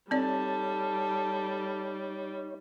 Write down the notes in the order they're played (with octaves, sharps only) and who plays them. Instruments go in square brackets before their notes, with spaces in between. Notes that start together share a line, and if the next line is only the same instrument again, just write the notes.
[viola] G3 [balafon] C4 D5 [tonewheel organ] D#4 C#5 [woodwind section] A4 A5